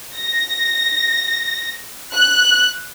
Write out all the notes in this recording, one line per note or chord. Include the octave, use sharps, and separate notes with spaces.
A#6
F#6